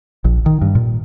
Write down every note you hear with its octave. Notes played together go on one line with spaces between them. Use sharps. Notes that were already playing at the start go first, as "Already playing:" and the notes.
A#1
D#3
G2
A#2